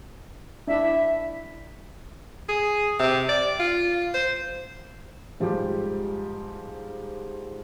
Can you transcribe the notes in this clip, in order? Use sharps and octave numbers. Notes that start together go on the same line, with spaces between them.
D4 E4 E5
G#4
C3
D5
F4
C5
G#2 F3 G3 G#3 G4